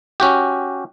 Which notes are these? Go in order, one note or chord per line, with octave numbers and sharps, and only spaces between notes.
C#4 F#4 G4